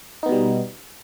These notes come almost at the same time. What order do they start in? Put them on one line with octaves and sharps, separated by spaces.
D#4 B3 B2 G3